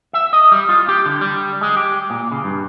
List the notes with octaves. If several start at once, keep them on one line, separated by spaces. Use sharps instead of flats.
E5
D#5
G3
F4
G4
D3
G3
G#3
G4
A#2
C#3
G2